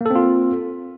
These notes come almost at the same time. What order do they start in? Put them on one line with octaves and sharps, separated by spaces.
A#3 A4 C4 F4